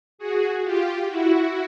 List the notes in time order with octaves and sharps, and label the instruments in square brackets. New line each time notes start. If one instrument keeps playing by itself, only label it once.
[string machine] F#4 G#4
F4 G4
E4 F#4